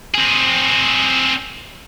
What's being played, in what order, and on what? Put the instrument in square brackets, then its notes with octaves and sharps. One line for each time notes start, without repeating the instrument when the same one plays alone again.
[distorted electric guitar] C4 G#4